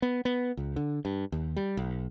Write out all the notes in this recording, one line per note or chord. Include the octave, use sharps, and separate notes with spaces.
B3
B3
C#2
D3
G2
D#2
G3
B1